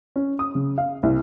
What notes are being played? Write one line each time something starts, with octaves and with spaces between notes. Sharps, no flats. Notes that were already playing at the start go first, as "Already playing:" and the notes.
C#4
D#6
C#3
F5
C2